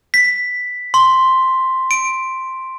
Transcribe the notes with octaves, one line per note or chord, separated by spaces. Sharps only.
B6
C6
D7